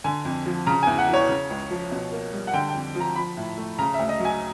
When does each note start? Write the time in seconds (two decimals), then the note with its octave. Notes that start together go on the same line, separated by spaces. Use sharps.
0.04 D3 G#5
0.25 F2
0.46 F3
0.67 C#3 A#5
0.83 E2 G#5
0.98 F#5
1.09 E3 C#5
1.29 C#3
1.50 C#2
1.70 F3
1.91 B2
2.12 A#3
2.33 G3
2.47 F#5
2.53 D3 G5
2.69 G5
2.74 F2
2.95 F3
3.00 A#5
3.16 F3 B5
3.37 A2
3.57 A3
3.79 C#3 A#5
3.94 D2 E5
4.09 D#5
4.20 F#3
4.25 G#5